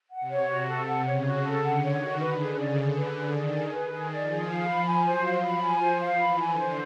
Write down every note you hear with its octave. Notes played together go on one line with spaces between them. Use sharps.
F#5
C3
C#5
C3 F#4
A4
F#5
C#3 C#5
F#4
A4
D3 F#5
C#5
D#3
F#4
D3 B4
G#4
C#3
D5
D3 G#4
B4
G#4
D#3 D5
G#4
B4
D#3 G#4
D5
F3
G#4
F5
B5
G#5
F#3 C5
F5
F3
B5
G#5
C5
F5
E3 B5
G#5
D3
C5